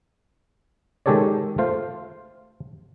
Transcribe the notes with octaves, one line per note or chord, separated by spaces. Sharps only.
D#3 G#3 G4 A4 C#5 D5
A3 F4 C5 F5